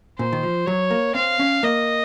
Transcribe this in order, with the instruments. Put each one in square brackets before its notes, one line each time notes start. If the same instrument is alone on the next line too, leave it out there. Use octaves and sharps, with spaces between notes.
[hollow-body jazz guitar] A#2 [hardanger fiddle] C5
[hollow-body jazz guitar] D#3
F3
[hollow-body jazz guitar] F#3 [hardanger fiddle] C#5
[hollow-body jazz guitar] A#3
[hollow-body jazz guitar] C4 [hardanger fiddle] F5
[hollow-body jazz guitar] C#4
[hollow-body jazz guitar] A#3 [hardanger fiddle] D#5